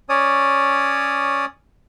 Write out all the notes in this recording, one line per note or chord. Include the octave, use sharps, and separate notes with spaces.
C#4 C#5 D5 D#6